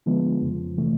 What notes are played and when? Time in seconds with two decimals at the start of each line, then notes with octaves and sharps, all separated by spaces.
0.06 D3 F3 G#3 B3
0.42 F2 C#3 F3
0.78 C3 E3 A3